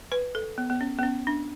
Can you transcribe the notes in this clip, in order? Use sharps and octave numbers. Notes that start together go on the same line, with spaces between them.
B4
A4
B3
B3
C#4
B3
C#4
D4